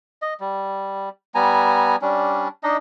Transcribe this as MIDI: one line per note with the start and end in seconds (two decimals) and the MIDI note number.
0.22 0.34 75
0.40 1.09 55
1.35 1.96 55
1.35 1.96 59
1.35 1.96 80
1.35 1.96 82
2.02 2.48 55
2.02 2.48 61
2.02 2.48 62
2.63 2.77 62
2.63 2.77 63
2.63 2.77 75